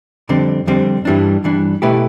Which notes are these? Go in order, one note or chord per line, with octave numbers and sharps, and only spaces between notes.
F2 D3 G3 C4
F2 D3 G3 C4
G2 E3 G3 D4
G2 E3 G3 D4
B2 A3 E4 G4 B4